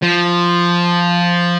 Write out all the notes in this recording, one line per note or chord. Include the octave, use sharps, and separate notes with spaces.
F3